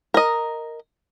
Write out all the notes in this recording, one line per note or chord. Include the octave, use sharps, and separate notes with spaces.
A#4 D#5